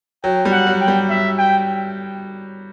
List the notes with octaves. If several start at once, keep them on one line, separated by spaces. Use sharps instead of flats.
F#3 G5
G3
F#5
F#3
G5
G3
E5
G5